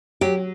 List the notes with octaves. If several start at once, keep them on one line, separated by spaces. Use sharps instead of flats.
F#3 G4